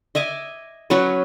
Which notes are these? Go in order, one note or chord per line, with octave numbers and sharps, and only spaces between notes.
D#5 E5 G#5 D6
F#3 C#4 B4